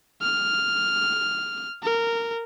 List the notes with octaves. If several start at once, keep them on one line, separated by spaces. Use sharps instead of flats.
F6
A#4